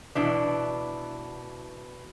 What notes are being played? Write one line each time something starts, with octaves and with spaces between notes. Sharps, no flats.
B2 E3 D4